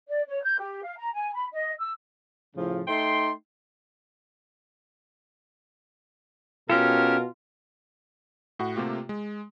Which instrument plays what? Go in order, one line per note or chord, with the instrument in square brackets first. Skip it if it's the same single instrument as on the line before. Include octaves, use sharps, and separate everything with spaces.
[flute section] D5
C#5
G6
G4
F5
A#5
G#5
B5
D#5
E6
[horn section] A2 C#3 F3
A3 D#4 G5 C6
[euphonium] B2 [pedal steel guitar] C#4 G4 A4 [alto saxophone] F4 [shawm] A#4
[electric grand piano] A2 F#4 F#5
C3 A3 A#3 F4 G4
G#3